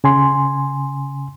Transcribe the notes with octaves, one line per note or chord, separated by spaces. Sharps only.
C#3 G#5 C6